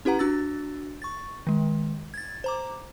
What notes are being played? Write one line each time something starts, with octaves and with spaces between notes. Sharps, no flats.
C#4 E4 G4 B4 F#5 A#5
D4 F#4 E6 A6
C#6 A6
D#3 G#3
G#6 A6
C5 A#5 D6